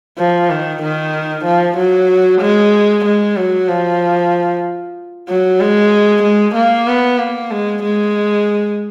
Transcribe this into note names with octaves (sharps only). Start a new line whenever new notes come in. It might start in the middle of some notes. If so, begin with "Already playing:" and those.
F3
D#3
D#3
F3
F#3
G#3
G#3
F#3
F3
F#3
G#3
G#3
A#3
B3
A#3
G#3
G#3